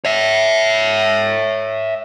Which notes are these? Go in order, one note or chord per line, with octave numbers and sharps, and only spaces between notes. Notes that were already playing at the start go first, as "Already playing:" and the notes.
C#5 E5